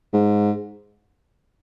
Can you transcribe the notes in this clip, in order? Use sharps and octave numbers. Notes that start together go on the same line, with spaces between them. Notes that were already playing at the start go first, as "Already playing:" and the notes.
G#2